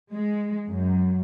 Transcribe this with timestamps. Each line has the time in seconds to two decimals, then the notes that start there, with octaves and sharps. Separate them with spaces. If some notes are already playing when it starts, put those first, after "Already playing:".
0.13 G#3
0.70 F#2